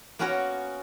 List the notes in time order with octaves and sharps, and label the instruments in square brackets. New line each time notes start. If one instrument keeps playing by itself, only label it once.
[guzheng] A#3 B3 C#4 F#4 A#4 C#5